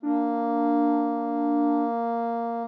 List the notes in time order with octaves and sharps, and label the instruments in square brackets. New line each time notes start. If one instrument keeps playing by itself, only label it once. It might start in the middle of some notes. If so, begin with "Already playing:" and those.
[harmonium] A#3 [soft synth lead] D4